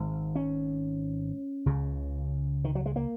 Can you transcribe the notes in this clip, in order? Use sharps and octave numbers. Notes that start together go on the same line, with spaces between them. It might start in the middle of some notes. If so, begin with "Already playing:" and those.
Already playing: G#1 G#2
C#4
C#2 C#3
D#3
F#3
G#3
A#3